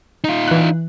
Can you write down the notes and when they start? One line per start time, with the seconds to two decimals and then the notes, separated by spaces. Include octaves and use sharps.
0.24 D#4 F4
0.48 E3 F#6